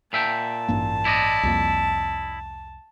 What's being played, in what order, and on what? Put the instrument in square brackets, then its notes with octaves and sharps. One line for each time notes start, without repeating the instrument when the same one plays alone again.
[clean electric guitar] A#2 E5 G5 [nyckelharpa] A5
[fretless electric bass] A1 G2 A#3
[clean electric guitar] E4 D5 D#5
[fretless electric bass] C2 F2 A#3